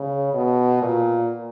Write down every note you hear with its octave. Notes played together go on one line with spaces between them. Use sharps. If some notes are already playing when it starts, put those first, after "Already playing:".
Already playing: C#3
B2
A#2